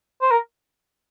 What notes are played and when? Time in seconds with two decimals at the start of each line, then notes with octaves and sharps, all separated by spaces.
0.21 C5
0.31 A#4